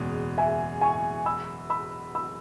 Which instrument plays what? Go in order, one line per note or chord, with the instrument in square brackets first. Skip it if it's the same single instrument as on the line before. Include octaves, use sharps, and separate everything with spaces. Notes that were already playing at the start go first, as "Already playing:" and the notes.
Already playing: [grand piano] F#1 E2 B2 G#3
[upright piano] E5 G#5
G#5 C#6
B5 E6
B5 E6
B5 E6